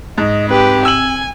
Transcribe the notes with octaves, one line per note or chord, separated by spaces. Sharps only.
G#2 D#5
C4 G4 B4
G#5 E6 F#7